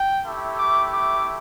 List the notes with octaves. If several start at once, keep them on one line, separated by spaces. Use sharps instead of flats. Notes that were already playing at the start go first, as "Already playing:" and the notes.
Already playing: G5
A3 E4 G4
D6
D6